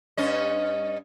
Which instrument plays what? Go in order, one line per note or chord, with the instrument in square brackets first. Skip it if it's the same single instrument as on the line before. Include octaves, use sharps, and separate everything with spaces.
[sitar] G2 C#4 D#5